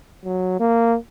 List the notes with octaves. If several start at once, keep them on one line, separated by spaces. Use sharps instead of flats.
F#3
A#3